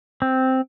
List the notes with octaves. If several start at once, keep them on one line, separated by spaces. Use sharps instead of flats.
C4